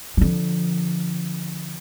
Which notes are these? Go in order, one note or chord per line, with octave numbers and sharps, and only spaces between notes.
D3 F3